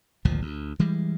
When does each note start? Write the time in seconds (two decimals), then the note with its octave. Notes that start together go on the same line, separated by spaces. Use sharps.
0.25 G#1 D2 A#2 F3
0.42 D2
0.79 E3 G3 G#3